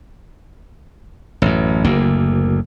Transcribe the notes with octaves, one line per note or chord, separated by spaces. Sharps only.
A1 F#2
F#1 D2 A#3